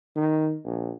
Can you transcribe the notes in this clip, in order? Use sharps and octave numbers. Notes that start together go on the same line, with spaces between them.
D#3
A#1